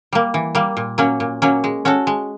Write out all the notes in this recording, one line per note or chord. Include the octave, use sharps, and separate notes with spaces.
G3 A#3
E3
G3 A#3
A#2
F#3 A#3 C#4
A#2
F#3 A#3 C#4
G#3
C#4 F#4 A4
G#3